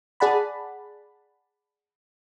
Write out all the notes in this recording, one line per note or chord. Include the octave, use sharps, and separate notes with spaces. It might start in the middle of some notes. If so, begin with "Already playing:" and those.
G#4 D5 F#5 A5 B5